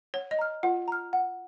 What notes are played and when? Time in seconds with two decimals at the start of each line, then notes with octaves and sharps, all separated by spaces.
0.14 C#5 F#5
0.31 D#5
0.39 A#5 F6
0.63 F4 F#5
0.88 A#5 F6
1.13 F#5